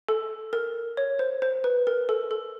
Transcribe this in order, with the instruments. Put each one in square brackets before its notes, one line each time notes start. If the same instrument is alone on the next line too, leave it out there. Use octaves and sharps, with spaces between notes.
[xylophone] A4
A#4
C#5
C5
C5
B4
A#4
A4
A4